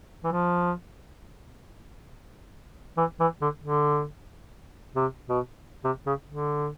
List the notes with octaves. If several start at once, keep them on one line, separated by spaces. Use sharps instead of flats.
E3
F3
E3
E3
D3
D3
C3
B2
C3
C#3
D3